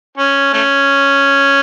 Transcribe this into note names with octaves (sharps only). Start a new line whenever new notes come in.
C#4
A3 C#4